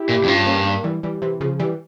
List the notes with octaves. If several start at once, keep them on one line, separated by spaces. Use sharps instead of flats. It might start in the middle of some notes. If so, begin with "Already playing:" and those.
Already playing: E4 G4
A#2
F2
G2 C#4 F4
A#3 C#4
G3 A#3
E3 G3
E3 G3
C3 E3
C#3 F3
E3 G3